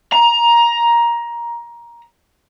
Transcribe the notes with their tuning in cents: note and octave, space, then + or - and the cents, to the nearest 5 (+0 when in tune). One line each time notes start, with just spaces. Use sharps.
A#5 +15